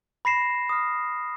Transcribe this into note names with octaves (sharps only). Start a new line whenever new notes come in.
B5 A#6 C7 E7
D#6 F6